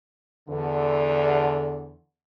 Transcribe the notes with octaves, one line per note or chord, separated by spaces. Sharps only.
E2 D3